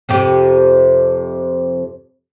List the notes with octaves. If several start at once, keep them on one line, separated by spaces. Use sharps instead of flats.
F2 C3 G4